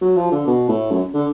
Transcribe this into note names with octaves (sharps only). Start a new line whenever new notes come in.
F#3
F3
D3
B2
A2
F#2
D3